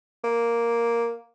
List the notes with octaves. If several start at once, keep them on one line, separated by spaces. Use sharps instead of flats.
A#3